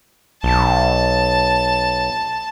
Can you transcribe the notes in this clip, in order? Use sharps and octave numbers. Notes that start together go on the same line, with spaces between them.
B1 A5